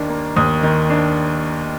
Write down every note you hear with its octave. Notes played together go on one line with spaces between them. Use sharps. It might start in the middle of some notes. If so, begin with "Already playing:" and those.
Already playing: D#2 D#3 D4
A#3
D#2 D#6
D#3
D4